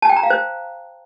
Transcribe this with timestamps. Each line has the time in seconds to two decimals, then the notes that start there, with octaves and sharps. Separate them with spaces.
0.02 A5
0.09 G5
0.16 A#5
0.23 F5
0.30 C5